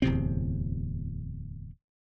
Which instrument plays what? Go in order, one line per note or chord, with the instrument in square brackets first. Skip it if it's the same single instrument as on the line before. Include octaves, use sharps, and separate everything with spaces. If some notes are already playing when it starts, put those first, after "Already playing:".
[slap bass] D1 E2 C3 C4